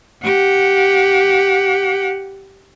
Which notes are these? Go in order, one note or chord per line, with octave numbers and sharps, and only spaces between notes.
G4 F#5